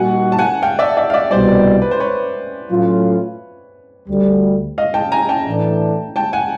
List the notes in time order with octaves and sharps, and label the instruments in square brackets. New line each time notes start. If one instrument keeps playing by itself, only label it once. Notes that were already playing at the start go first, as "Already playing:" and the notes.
Already playing: [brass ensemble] A#2 G3 A#3 D#4 F#4 [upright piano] F#5 G#5
[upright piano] A5
F#5 G#5
F5 G5
D5 E5
D5 E5
F5
D5 E5
[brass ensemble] C2 B2 G3 [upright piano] C5 D5
[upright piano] B4
C5
B4 C#5
[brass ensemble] A2 F#3 A3 C#4 F4
D2 D3 G3
[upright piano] D#5 F5
G5 A5
G#5 A#5
G5 A5
[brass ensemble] A2 E3 A3 D4
[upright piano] G5 A5
F#5 G#5